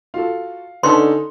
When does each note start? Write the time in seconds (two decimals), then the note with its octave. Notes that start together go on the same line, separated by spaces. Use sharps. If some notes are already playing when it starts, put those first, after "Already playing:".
0.14 F4 F#4 A4 F5
0.83 D3 C#4 D#4 A4 B4 A5 C6